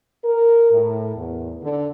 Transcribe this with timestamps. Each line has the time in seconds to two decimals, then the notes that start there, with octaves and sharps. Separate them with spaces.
0.24 A#4
0.71 A2
1.15 E2
1.62 D3